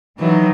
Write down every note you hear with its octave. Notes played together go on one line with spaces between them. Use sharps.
D#3 E3 F#3 D#4